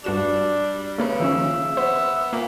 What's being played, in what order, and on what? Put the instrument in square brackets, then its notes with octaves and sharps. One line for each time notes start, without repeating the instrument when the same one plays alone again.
[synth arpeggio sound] G2 F#4 E7 [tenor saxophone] G3 [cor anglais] D4
[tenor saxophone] C#3 [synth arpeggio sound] A3 A#3 B4
[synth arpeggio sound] D#3 F3 C#4 [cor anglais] E5
[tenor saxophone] B3 [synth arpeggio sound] C5
[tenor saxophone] A#2 [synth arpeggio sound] A#3